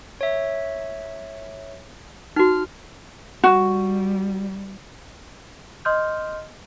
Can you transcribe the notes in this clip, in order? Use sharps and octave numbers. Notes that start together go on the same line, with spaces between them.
C#5 E5
D#4 F#4 F6
G3 F#4
D#5 C6 D#6 F6 G6